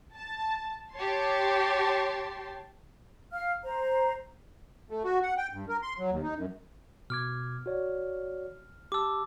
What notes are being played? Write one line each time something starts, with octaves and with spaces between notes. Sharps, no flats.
A5
G4 C#5 A5 C6
F5 F6
C5 A#5
A3
F#4
F#5
G5
G2
A#4
C6
F#3
D#2
D#4
F#2
B2 D6 F6 G#6
F#4 C#5 D5
G4 A5 D6 E6